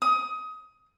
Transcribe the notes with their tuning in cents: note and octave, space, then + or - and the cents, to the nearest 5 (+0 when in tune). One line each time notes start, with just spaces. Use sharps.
D#6 +20